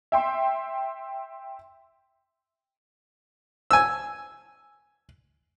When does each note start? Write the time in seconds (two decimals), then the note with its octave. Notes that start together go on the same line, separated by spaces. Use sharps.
0.12 E5 G5 C6
3.71 G#5 E6